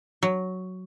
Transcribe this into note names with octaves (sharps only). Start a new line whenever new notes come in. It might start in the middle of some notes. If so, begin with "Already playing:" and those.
F#3